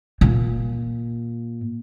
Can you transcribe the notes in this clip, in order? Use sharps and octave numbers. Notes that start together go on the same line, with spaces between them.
A#2